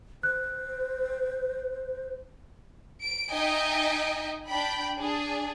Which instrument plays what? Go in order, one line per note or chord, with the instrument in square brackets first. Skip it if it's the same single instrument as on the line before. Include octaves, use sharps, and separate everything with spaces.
[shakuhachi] C5 [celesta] F#6
[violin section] D7
D#4 D#5 E5 G5 G#5
D4 G5 B5
D4 G#4